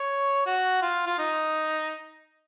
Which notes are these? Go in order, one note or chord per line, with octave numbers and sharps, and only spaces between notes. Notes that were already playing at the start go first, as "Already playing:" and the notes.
Already playing: C#5
F#4
F4
F4
D#4